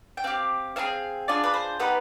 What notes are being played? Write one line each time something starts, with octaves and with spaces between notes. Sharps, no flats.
G5
C4 G4 F5
C4 D#4 G#4 F5
D4 F4 G#4 D5
B4
C5
B3 D#4 G4 B4